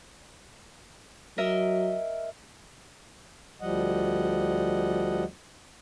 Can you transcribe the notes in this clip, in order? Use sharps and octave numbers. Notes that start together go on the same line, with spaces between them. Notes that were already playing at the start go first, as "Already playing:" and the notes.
F#3 A#4 D#5 E5
D2 F3 G3 D#5 F#5